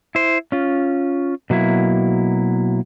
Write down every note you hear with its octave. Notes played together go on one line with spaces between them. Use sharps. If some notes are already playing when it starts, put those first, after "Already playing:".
E4 C5
C#4 F4
B2 F#3 A#3 E4